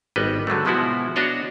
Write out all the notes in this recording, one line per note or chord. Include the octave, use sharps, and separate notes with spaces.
G#1 G3 B3 B4 D#5
D3 F#3 G3 A3
B2 F3 G#3 B3 E4 F#4
B3 D4 F#4 C#5 D#5 F#5